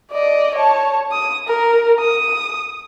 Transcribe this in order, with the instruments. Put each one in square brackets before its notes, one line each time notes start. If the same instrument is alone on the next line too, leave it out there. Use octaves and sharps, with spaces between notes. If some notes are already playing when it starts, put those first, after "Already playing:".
[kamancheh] D5 D#5
C#5 A5
D#6
A#4
D#6